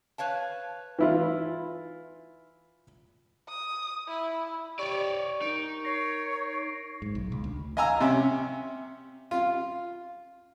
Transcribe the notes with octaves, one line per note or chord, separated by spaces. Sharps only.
B4 C#5 F5 A5
E3 E4 F4
D#6
E4
G4 C#5 D5 C#6
D#4 A#4 D7
C#5 A#6 C7
G#2
B1
C#2
D2
D#5 F5 G#5 A#5 E6
C3 C#4
F4 F5